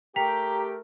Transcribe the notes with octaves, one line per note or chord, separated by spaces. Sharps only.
A3 G4 A#4 G5 A#5 B6 F7